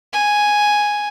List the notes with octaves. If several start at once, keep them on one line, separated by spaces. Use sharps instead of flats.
G#5